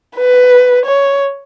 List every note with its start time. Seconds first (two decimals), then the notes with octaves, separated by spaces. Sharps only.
0.15 B4
0.85 C#5